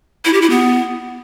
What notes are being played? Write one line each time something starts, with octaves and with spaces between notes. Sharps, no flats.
E4
G4
E4
B3